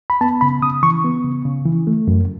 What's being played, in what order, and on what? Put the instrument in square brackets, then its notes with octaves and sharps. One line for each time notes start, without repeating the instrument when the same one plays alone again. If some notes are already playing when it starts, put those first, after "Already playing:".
[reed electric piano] B5
B3 A5
C#3 B5
C#3 D#6
E3 C#6
B3
C#3
C#3
E3
A3
F#2